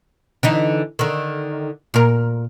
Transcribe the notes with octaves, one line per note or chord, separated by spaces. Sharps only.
D3 E3 D#4
D3 D#3
A#2 A#4